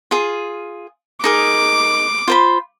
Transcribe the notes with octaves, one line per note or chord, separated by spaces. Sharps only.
F4 G#4
D#4 G#4 A#4 D6
F4 C5 B5